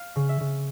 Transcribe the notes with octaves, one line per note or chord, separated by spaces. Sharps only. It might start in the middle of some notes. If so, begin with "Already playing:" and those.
Already playing: F5
C#3
E5
C#3